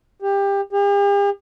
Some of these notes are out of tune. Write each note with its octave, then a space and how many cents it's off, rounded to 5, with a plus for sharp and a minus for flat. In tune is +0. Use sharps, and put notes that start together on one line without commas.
G4 +20
G4 +45